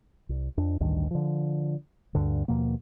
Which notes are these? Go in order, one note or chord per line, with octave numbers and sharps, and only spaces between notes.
C2
F2 D4
A1 D2 G2 D#3
D3 F3
D2 G2 D3
D#2 B2 F3 A#3